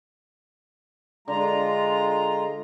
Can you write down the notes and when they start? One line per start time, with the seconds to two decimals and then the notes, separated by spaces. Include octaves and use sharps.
1.28 D3 G#3 F4 A#5